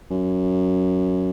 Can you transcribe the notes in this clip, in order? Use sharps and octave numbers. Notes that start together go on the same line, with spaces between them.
F#2